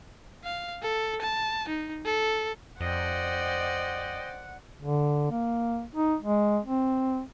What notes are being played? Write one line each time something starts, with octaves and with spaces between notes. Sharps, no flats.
F5
A4
A5
D#4
A4
F2 C5 D5 D#5 F#5 G5
D3
A#3
D#4
G#3
C4